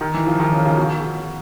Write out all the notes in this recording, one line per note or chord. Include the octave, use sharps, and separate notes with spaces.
D#3
E3
F3
D#3
C#3
C#3
B2